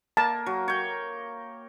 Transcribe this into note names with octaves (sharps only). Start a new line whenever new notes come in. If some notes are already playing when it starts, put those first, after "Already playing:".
A#3 A5
F#3
C#5 G5